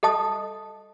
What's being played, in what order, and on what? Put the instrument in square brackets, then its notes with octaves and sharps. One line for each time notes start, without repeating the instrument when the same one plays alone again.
[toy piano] A4 D#5 A5 D#6